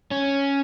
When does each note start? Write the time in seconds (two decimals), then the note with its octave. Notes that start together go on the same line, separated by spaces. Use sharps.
0.11 C#4